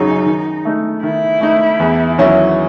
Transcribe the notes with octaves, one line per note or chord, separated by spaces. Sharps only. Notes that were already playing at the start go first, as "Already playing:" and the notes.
Already playing: F#2 C#3 F#3 D#4
D#3
A3 D#4
D#3 E4
A3 D#4
E2
D#3 F#3 C#4 E4